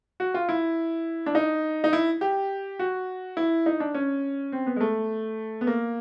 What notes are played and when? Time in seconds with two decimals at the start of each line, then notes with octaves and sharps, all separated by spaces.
0.20 F#4
0.34 F4
0.49 E4
1.26 D4
1.35 D#4
1.84 D#4
1.93 E4
2.21 G4
2.79 F#4
3.37 E4
3.66 D#4
3.80 D4
3.94 C#4
4.52 C4
4.66 B3
4.76 G#3
4.81 A3
5.61 B3
5.67 A#3